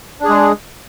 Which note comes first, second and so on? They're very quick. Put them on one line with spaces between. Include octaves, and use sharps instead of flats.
D4 G#4 G#3